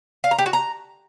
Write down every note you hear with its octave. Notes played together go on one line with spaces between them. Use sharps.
F5
A#5
G4
F#4
A#5